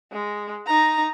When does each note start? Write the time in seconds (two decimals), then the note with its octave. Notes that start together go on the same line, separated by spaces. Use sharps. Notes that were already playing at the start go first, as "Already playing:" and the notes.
0.12 G#3
0.66 D#4 A#5